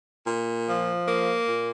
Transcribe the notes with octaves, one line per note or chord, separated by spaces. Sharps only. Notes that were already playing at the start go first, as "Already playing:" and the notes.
A#2
F3
A#3
A#2